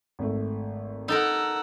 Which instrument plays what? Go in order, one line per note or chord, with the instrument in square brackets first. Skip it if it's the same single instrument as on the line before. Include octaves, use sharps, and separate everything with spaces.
[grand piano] G#1 A3
[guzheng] D#4 A4 A#4 [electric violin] F#5 E6